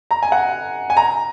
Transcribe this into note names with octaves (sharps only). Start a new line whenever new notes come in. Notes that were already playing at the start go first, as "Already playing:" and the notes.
A#5
G#5
F#5
G#5
A#5